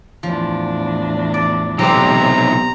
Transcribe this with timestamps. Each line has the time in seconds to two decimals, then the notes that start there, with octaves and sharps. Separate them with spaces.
0.23 E2 A2 F3 D4
1.34 D5
1.79 B1 C3 C4 G4 A#5